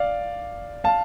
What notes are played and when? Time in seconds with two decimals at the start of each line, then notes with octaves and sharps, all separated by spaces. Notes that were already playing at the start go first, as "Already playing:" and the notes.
Already playing: D5 F5
0.84 F5 A5